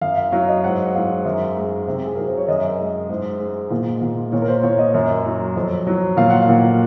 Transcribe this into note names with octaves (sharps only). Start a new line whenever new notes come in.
F#2 F5
F5
F#3 F5
D#5
G#2 F#5
G#2 F5
F#2
G#3
C3
G#4
F#3 A#4
C5
C#5
F#2 D#5
G#3
G#2
G#3
A#2
A#2
A#2 C#5
A#4
C5
A#2 C#5
D#5
F#2
F#3
F2
F#3
A#2 F5
F#5
F5
A#2